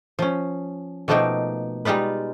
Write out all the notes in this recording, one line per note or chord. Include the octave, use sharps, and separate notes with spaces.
F3 C#4
B2 F3 A3 A#3 D#4 G5
G3 G#3 D#4 F4 B4